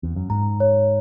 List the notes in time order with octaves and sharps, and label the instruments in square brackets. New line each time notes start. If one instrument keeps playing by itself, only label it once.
[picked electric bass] E2
F#2
[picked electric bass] G#2 [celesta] A#5
[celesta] C#5